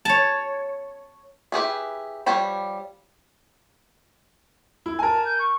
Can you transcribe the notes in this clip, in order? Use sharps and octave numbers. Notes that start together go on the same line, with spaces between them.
C#5 A5
E4 G4 G#4 B4
F3 G3 C#5 G5 B5
E4
A#4 G#5 A5
G6
C#6